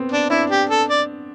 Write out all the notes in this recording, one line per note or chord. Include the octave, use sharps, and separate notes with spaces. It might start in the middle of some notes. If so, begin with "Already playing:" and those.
Already playing: B3 C4
D4
D4 E4
G4
A4
D5